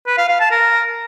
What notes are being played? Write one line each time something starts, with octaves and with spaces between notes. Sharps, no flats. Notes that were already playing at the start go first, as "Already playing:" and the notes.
B4
F5
F5
A5
A#4